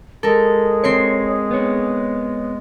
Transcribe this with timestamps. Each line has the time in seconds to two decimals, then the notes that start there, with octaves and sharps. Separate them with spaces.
0.23 G#3 A4 A#4
0.84 C4 C#5 C7 C#7
1.51 B3 C#5